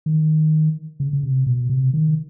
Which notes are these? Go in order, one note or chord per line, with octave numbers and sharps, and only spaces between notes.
D#3
C#3
C#3
C3
B2
C3
D#3